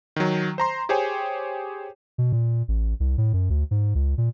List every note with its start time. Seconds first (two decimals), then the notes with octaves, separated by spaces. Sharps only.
0.16 D#3 F#3
0.58 C5 A#5 C6
0.89 G4 G#4 C5 C#5 G5 G#5
2.18 B2
2.32 A#2
2.68 A1
3.00 C2
3.18 A2
3.33 F#2
3.50 D2
3.71 G#2
3.95 C#2
4.18 A#2